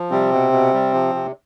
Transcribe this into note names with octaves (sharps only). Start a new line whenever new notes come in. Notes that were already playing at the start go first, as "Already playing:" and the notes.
Already playing: F3
C3 G3 C4
B2
B2
G3
F3
C3